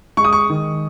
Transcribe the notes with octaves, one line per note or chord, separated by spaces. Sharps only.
G#3 C#6
D#6
C#6
D#3